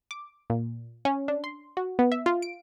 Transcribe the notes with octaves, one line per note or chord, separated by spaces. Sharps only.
D6
A#2
C#4
D4
C6
F#4
B3
E5
F4
D7